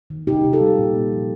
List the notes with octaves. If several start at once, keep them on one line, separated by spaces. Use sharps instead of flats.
D#3
C3 D#4 G4
C3
F4 A4
G3
A#2
A#3
F3